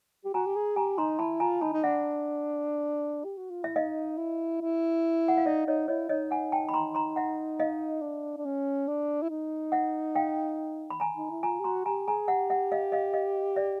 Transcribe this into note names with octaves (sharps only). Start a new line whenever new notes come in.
G4
F#4 G#5 A#5
G4
G#4
G4 G#5 A#5
D#4 A#5 C6
E4 A5 B5
F4 G#5 A#5
D#4 A5 B5
D#4
D4 E5 F#5
G4
F#4
F4
E4 E5
D#4 D#5 F5
E4
E4
F#5
F5
D#4 D5 E5
D#4 C#5 D#5
E4 C#5 D#5
D#4 C#5 D#5
F#5 G#5
G5 A5
B5
A#5 C6
A#5 C6
E5 F#5
D#5 F5
D4
D4
C#4
D4
E4
D#4
E5 F#5
F5 G5
B5
G#5 A#5
D#4
E4
F4 G#5 A#5
G4
F#4 A#5 C6
G4 G#5 A#5
G#4 G#5 A#5
G4 E5 F#5
E5 F#5
D#5 F5
D#5 F5
D#5 F5
D5 E5